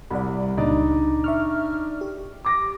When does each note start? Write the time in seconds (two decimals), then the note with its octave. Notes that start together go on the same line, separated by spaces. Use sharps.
0.10 C2 D5 F#5 B5
0.57 C#2 A#2 D4 D#4 D5
1.24 E5 C#6 F6
2.01 G4
2.45 D6 A#6